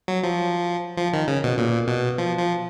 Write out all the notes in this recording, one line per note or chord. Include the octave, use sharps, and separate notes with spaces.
F#3
F3
F3
D#3
C#3
B2
A#2
B2
F3
F3